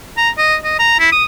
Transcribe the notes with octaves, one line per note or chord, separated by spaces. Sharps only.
A#5
D#5
D#5
A#5
E4
D#6